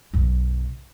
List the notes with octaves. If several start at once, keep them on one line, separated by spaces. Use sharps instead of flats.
B1 F#2